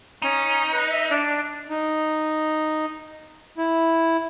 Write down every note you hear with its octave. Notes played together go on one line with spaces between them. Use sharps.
C#4 D#4
B4
E5
D4
D#4
E4